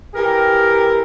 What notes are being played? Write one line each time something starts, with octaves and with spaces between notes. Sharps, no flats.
E3 G4 A#4